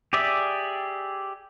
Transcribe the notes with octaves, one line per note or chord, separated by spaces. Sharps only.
G4 G#4 D5 E5